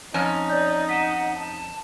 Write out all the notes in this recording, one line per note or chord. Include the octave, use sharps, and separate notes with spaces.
F2 C#4 D#4
C#5 D5 G6
F#5 B6 D#7 E7
A5